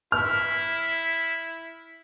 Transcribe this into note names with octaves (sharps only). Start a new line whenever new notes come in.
E4 F6